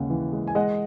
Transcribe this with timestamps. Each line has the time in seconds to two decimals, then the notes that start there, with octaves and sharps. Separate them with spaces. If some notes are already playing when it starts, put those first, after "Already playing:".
Already playing: D#2 C#3 G#3 F#5
0.10 E3
0.32 G#3
0.48 G#5
0.55 G#3 D#5 F#5